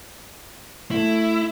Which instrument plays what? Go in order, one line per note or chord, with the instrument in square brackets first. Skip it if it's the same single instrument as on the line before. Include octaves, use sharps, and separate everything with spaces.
[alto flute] A3 [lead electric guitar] E4